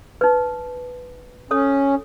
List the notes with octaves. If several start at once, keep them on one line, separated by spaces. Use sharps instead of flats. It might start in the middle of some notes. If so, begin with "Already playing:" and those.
D#4 B4
C#4 A4 C#5 D#6